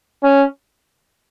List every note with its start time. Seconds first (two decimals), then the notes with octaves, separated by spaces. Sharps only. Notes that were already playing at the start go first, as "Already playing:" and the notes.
0.24 C#4